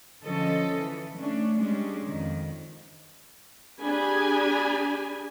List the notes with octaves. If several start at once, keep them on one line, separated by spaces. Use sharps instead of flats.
D3 F3 C#4 A4 D#5
E3
A3 C#4 D4
G3 G#3 C#4 D4
F2 D#3
D4 G4 G#4 G#5 B5